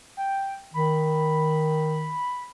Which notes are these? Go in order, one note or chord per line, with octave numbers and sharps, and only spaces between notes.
G5
D#3 B5